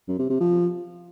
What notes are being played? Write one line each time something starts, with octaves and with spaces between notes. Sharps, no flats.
F#2
C3
C3
F3